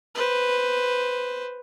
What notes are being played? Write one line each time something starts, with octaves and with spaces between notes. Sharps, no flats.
B4 C5